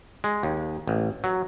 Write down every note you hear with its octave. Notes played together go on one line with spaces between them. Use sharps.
G#3
D#2
A1
F#3